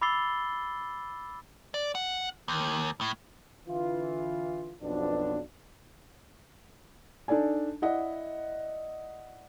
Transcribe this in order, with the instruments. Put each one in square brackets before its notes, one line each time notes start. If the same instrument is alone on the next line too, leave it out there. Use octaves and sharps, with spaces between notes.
[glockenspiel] B5 D6 E6 A6 C7 G7
[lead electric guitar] D5
F#5
D#2
A2
[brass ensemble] D3 E3 F4
B1 F2 B2 D4
[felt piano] D4 D#4 A4 D5 G#5
E4 D5 D#5 F#5